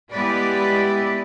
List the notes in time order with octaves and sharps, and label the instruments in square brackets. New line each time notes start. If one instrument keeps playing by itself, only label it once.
[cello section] G#3 B3 E4 G4 B4 D5